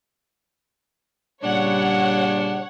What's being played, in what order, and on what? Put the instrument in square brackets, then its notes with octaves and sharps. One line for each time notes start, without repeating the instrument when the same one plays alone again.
[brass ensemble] A#2 C#3 G3 [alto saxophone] D4 [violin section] C#5 F#5